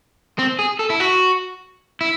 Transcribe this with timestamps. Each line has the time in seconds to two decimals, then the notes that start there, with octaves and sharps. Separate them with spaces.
0.39 C4
0.59 G#4
0.79 A4
0.90 E4
1.00 F#4
2.01 E4